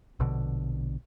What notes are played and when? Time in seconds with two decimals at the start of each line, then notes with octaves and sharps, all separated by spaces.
0.20 A#1 B2 D3